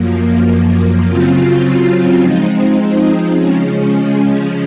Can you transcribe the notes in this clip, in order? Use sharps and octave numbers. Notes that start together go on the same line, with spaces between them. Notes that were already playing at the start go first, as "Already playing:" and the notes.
Already playing: F#2 F3 A#3
C#3 F#3 C4 F4
F3 G#3 C4 D#4
C#3 F3 G#3 C#4